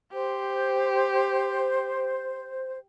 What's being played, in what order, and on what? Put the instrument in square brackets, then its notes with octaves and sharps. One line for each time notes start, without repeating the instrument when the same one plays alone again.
[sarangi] G4 [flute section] C5